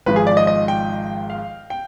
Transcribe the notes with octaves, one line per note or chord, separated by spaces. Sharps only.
G#1 G#2 F3 B4
G#4
D5
D#5
D#5
G5
F5
G5